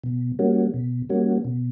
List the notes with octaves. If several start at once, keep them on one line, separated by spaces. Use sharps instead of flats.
B2
G3 A#3 C#4 F#4
B2
G3 A#3 C#4 F#4
B2